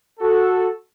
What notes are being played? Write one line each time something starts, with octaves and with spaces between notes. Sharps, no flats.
F#4 A4